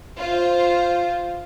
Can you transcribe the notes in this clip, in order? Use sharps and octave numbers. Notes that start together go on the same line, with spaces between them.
F4 C5